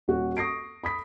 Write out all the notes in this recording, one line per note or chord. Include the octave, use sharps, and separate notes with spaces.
D#1 F#4
C#6 D#6 A#6 C7 D7
B5 D#6 B6